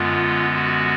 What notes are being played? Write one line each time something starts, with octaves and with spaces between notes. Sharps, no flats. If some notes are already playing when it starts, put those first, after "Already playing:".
Already playing: F#2 D3 G#3 B3 F4
F#4